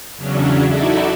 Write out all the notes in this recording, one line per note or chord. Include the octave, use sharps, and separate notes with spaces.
E2 C#3 F#3 C#4 D4
D#4 E4 F#4 A4 D5 E5